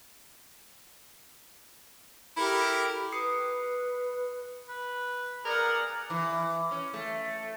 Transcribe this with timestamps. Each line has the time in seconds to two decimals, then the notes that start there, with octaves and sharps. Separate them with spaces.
2.36 E4 G4 A4 A#4
3.13 B4 D#6 C7 C#7
4.69 B4
5.45 G#4 A#4 D5 F#5 A#5 F6
6.10 E3
6.71 C#4
6.94 A3